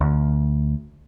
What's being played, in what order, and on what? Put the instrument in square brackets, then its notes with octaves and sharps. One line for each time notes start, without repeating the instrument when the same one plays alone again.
[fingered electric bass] D2